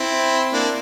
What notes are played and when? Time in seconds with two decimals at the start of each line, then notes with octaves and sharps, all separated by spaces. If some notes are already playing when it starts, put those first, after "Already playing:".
Already playing: C4 E4
0.53 A#3 D4